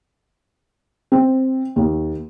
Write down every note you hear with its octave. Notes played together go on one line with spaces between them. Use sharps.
C4
D#2